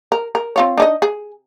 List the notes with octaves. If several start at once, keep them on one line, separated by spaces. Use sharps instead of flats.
A#4
A#4
C4 F4 C#5
D4 D#4 D#5
G#4